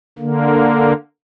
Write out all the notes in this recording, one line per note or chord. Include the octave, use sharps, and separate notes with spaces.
D3 A#3